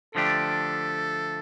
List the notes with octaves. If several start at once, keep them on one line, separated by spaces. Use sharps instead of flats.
D3 F3 A3 D4 G4 A4